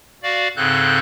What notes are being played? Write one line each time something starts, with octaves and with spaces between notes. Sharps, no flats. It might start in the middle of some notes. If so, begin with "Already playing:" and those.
F#4 D5 F5
G#2 C#3 C4 A4 F#6 G6